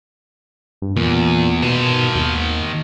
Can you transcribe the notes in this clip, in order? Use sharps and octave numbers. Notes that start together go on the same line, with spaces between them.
G2
E2 A#2
B2 D#3 A5
D#2